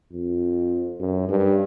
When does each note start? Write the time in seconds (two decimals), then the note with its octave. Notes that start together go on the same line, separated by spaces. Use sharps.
0.12 F2
1.00 F#2
1.29 G2